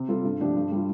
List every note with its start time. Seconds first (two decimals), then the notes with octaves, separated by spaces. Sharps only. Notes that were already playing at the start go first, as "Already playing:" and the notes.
Already playing: C3
0.08 G3 F4 A4
0.24 G2
0.40 F3 A3 D4 G4
0.55 G2
0.72 G3 F4